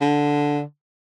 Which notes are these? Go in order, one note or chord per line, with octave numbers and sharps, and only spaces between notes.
D3